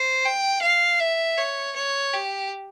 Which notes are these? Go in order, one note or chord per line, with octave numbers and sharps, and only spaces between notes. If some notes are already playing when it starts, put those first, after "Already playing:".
Already playing: C5
G5
F5
E5
C#5
C#5
G4